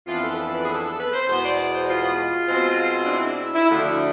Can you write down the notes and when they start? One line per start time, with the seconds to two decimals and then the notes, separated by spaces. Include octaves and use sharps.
0.07 F2 E3 B3 D4 F4
0.22 A4
0.32 B4
0.37 A4
0.52 B4
0.61 G#4
0.67 A4
0.83 A4
0.98 B4
1.13 C5
1.27 E2 B2 G#3 B3 C5
1.43 D5
1.58 D5
1.73 C5
1.89 F4
2.49 B2 G#3 C4
3.03 D4
3.10 E4
3.24 D4
3.39 E4
3.55 E4
3.69 D2 D3 F3 A3 D4 F4
3.85 E4